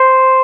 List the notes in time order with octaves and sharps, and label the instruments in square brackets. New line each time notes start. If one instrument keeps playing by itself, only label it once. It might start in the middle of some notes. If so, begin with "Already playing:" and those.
Already playing: [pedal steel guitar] C5